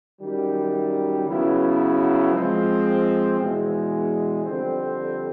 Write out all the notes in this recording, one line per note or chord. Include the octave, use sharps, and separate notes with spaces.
F#2 D#3 G3
C#3 F#3 B3 E4
F3 G#3 C4
E2 B2 G#3
F2 D3 G3 C4